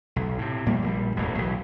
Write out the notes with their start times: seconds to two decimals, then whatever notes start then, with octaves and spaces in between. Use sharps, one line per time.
0.16 B1
0.38 A2 C3
0.66 A#1 A#2 G3 A#3
0.82 A#1 C#3 G3
1.16 E1 A1 D#2 A2
1.38 B1 E3